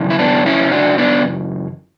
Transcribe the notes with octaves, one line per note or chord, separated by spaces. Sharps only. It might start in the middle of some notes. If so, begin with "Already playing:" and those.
Already playing: F#2 C#3 E3
E4
B3 D4
C#4 E4
D4 F#4
B3 D4